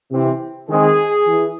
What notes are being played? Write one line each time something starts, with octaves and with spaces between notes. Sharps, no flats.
C3 E3 C4
D#3 G#3 C4 G#4
E3